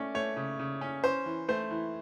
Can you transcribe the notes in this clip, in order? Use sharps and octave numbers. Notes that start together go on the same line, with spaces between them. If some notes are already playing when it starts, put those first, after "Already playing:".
Already playing: A3 C#4 D5
A3 C#5
C#3
C#3
C#4
C#4 C5
E3
A3 C5
E3